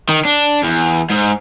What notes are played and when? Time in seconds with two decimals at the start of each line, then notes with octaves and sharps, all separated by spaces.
0.09 D#3
0.25 D4
0.63 E2
1.10 G#2